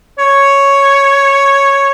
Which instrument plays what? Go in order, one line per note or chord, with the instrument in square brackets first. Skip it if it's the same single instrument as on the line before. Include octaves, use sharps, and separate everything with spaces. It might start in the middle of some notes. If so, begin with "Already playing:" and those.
[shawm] C#5